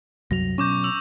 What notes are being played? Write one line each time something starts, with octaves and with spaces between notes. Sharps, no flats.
C2 F#2 F#3 A#6 F7
B2 F#3 C#4 C#6 D6 G6
E6 F7